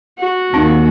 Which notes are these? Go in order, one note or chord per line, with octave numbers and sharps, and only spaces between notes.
F#4
D#2 C4 D#4